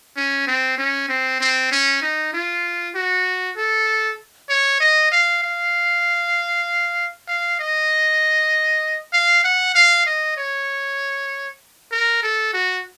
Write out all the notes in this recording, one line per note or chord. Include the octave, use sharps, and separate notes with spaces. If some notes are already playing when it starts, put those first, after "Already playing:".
C#4
C4
C#4
C4
C4
C#4
D#4
F4
F#4
A4
C#5
D#5
F5
F5
F5
D#5
F5
F#5
F5
D#5
C#5
A#4
A4
F#4